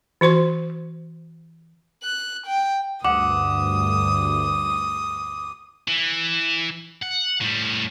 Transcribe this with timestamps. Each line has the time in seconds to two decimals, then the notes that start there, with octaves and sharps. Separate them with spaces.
0.21 E3 F#4 C5 C6
2.03 F#6
2.46 G5
3.04 D2 G2 F#5 D6 D#6
5.88 E3
7.02 F#5
7.41 A2 G3